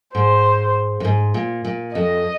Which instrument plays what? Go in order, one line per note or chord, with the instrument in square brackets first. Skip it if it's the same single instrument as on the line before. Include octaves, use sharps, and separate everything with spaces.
[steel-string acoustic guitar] G#2 [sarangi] C5
[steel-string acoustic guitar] F2
G#2
A#2
A#2
[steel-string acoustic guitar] F2 [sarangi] D#5